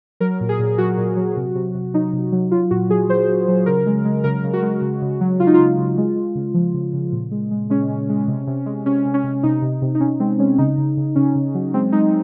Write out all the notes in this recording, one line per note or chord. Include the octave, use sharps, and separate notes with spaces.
F#3 A#4
A#2
G#4
A#2
F#3 F#4
A#2
F#3
C3
C3
C3
F#3 D#4
C3
F#3
F#3 F4
A#2 F#4
F#3 G#4
F#3 C5
F#3
F#3
C#3 A#4
G#3
G#3
C#3 A#4
C#3
F#4
G#3
C#3
C#3
F#3
C#3 F4
D#4
C#3 F4
C#3
G#3
G#3
C#3
F3
C#3
C#3
A#2
G#3
G#3
G#3 C#4
G#3
G#3
C3
C3
G#3
C3 C#4
C3
C#4
C3
C3 D#4
C3
C3
D#4
C3 C#4
G#3 C4
G#3 C#4
C#3 D#4
C#3
C#3
C#3 C#4
C#3
F#3
G#3 C4
G#3 D#4